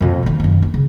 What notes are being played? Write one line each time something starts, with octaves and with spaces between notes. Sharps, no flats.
F2 B2
D#3 F3
F#2 D#3
D4
C#3